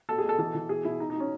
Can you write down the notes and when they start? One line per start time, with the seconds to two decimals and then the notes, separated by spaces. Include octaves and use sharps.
0.09 B2 A4
0.18 G#4
0.24 B2 A4
0.38 E3 A4
0.54 E3
0.69 B2 G#4
0.84 B2 E4
0.99 B2 D#4
1.10 D#4
1.15 B2
1.20 C#4